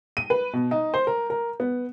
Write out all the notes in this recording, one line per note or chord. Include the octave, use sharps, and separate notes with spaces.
D#7
B4
B2
D#4
C5
A#4
A#4
B3